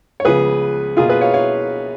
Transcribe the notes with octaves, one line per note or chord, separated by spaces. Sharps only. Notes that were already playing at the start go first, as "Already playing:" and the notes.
C#5
C#2 C#3 F3 B3 G#4 B4
B2 A#3 F4 G#4
G#4 B4
C#5 F5
C#5 F5